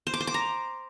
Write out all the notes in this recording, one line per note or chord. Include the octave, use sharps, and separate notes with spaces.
C5
D6
C5
D6
A#5